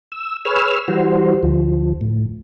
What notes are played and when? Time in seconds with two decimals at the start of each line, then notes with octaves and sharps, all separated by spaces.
0.12 E6
0.45 G#4 B4 C#5 E6 F6
0.88 E3 G3 F#4 C5
1.43 D2 F3
2.01 A2